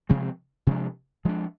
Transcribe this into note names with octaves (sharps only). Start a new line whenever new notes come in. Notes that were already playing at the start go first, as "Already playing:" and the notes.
C3 F3 G#3 C4
C3 F3 G#3 D4
F3 G#3 D4